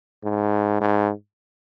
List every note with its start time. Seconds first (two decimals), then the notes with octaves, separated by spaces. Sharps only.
0.24 G#2
0.81 G#2